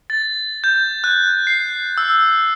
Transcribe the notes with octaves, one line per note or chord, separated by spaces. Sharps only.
A6
G6
F#6
C7
E6